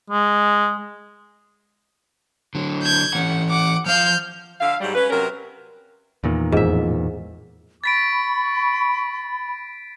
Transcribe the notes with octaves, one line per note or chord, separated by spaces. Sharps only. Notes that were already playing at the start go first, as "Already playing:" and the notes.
G#3
D3 F#3
G6 G#6
E3 C#4 F#5
F#5 D6
F3 F5 F6 G6
D3 E5 F5
G#2 F#3 G3
C#4 B4
C3 F#3 C#4 A#4
E2 A#2 D#3
A1 F2 G#2 E5
B5 C#6 A6 B6 D7